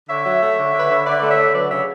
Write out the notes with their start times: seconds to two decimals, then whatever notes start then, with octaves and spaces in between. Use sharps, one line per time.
0.09 D3 C#5 E5
0.26 F#3
0.42 A3
0.59 D3
0.74 D3
0.79 B4
0.90 D3 C#5
1.06 D3 B4 D5
1.20 A3 D5
1.30 C#5 E5
1.39 D3
1.55 F#3 B4 D5
1.71 C#3 C#5 E5